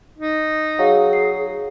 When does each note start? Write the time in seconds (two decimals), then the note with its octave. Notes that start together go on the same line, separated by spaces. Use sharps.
0.18 D#4
0.79 F#3 G#4 F5
1.13 C7